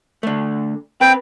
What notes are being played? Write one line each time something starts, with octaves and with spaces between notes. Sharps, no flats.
D3 A3
C4 B4 G5